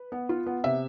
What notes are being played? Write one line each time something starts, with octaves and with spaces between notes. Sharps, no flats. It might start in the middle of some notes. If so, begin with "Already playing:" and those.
Already playing: B4
B3
F4
B3
C3 E5